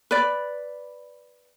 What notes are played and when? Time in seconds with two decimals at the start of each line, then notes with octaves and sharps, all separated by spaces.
0.11 B4 D5